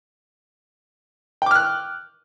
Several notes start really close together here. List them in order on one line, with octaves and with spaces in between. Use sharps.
G5 D6 F6 F#6